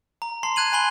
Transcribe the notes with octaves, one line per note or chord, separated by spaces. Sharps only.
A#5
A5 C6 C7
A5 F#6 G#6 D#7 F#7
G#5 A5 B5 C6 F#7 G7